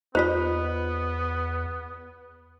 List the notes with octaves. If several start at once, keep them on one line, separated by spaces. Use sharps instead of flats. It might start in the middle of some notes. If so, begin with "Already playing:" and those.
E2 B3 D#4 F4 C5 D#5